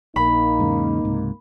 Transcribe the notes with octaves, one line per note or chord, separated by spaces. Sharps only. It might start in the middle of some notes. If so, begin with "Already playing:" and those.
A#1 A#3 D#4 B5
E2 G#2 C#3
C#2 G#2 C3